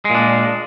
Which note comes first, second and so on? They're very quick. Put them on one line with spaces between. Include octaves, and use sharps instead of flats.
G#3 A#2 D4